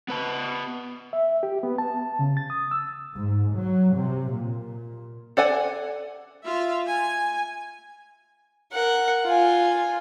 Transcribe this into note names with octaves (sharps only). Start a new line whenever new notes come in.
B3 B4 A5
E5
G4
B3
A5
C#3
A6
D#6
E6
G#2
F#3
C3
A#2
A4 D5 F#5 G#5
F4 E5
G#5
A#4 F#5
F4 G#5